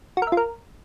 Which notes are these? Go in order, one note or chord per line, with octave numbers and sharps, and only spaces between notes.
F#4
A#4
E5
F4
A#4